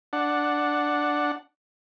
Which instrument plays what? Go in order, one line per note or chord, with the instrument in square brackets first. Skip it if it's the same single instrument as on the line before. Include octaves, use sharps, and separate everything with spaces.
[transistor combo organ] D4 F#5